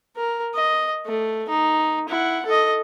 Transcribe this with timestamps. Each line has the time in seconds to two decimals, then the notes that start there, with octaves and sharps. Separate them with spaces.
0.16 A#4
0.54 D#5
1.06 A3
1.49 D#4
2.08 E4 F#5
2.46 A4 D#5